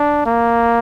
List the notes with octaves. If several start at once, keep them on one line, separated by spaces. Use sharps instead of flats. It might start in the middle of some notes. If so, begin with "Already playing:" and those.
Already playing: D4
A#3